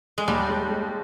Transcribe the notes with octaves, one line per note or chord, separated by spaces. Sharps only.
G#3
D#2 G3
G#3
G#3